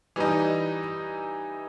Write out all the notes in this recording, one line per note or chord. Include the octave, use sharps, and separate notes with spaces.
E3 G3 D#4